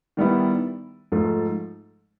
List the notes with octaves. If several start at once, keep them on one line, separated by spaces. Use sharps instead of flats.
D#3 G3 B3 E4
G#2 F3 A3